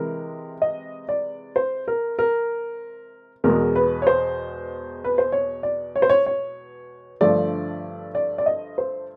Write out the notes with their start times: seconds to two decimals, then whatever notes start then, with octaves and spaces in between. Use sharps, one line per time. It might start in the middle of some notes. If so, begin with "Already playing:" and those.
Already playing: C3 E3 G#3 A#4
0.62 D#5
1.09 D5
1.56 C5
1.88 A#4
2.19 A#4
3.44 E2 B2 G#3 A#4
3.75 B4
4.02 C#5
4.07 C5
5.04 B4
5.18 C5
5.32 C#5
5.63 D5
5.96 C#5
6.02 C5
6.10 C#5
6.26 C#5
7.21 G2 D3 F3 A3 D5
8.15 D5
8.38 D5
8.46 D#5
8.78 C5